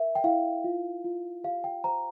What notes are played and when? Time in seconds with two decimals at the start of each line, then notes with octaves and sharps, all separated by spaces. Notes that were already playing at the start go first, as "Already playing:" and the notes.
Already playing: A#4 E5
0.15 G5
0.24 E4 F5
0.64 F4
1.04 F4
1.44 G4 F5
1.64 G5
1.84 C5 A#5